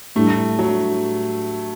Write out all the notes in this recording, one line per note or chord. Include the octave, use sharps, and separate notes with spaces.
A2 G3 A3 D4
F#3